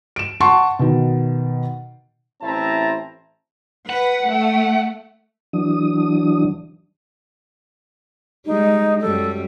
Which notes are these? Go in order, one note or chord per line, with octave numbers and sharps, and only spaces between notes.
D7 E7
F#5 A5 C6 C#6
B2 D#3
A1 C4 E4 E5 A5 A#5
B4 F#5
A3
E3 F#3 D4 D#6
G3 G#3 D#4
F#2 G3 A4